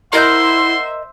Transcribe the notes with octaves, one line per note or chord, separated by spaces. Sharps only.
E4 A#4 C5 D#5 E5 F#5 C6 G6